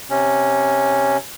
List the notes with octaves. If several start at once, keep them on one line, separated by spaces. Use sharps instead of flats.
C3 C#4